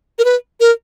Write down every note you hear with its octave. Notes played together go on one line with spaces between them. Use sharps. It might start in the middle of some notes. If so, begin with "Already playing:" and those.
A#4
B4
A#4